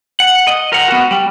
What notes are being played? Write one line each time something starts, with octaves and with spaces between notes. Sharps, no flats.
F#5
D#5
A#4 F#5
B3 F#4
G3